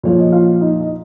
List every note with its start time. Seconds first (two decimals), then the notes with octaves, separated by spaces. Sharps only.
0.03 A#2 F3 C#5
0.19 D#5
0.32 F4 F5
0.61 D#4 D#5
0.81 D#5